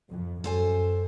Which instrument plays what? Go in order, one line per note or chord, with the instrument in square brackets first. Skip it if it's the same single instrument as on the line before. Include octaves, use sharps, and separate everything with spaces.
[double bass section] F2
[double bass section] F#2 [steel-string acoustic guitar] A4 C5 G#5